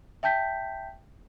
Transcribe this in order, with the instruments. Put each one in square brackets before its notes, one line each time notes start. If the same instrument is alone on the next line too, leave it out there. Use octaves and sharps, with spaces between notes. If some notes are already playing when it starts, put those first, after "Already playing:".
[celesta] E5 G5 A5 G6 B6